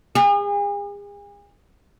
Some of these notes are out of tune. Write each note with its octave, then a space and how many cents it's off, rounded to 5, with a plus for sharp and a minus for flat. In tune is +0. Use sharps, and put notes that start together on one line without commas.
G#4 -40